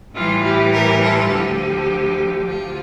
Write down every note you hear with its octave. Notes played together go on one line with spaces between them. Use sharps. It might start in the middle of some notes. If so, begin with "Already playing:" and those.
A2 E3 G3 F4
G4
G4 A#4
F4 A4
D2 D3 F3 G4
D2 D3 F3 F4